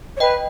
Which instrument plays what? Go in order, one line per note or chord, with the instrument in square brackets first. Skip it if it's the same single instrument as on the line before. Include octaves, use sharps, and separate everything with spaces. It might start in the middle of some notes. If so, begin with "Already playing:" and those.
[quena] C#5
[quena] B4 [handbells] D#5 G5